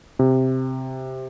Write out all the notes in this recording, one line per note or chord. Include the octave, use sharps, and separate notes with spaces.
C3